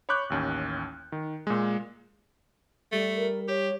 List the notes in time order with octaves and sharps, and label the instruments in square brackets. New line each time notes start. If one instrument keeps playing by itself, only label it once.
[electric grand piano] C#5 B5 C#6 D6 F#6 G6
A1 D#2 C#4
D#3
A#2 G#3
[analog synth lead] G3 [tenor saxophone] A3
[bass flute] A#4
[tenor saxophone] G4 [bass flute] C#5